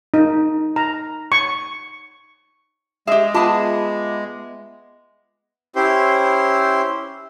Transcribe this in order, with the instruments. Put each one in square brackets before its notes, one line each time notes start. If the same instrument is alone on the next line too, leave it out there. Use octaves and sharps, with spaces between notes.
[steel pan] D#4
A#5
C#6
[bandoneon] G#3 [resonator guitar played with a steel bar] G4 G#4 [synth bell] E5
[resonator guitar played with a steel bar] B3 G#4 A5 [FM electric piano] F4 B5 D6
[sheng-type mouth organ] C#4 E4 G4 C5 C6